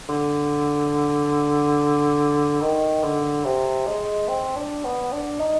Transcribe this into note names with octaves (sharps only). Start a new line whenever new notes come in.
D3
D#3
D3
C3
G#3
C4
D4
B3
D4
D#4